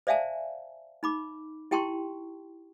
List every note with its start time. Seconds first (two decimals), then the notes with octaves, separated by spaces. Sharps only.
0.07 C5 D5 E5 F5 G#5 A5
1.03 D#4 B5 D6
1.71 E4 G4 G5 A5 C6 C#6